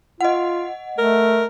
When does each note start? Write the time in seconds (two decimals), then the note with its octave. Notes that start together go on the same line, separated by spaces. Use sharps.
0.21 F4 D#5 F#5
0.98 A3 A#4